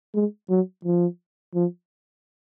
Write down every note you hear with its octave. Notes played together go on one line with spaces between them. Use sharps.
G#3
F#3
F3
F3